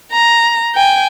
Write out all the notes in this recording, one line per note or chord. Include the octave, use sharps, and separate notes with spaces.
A#5
G5 G#5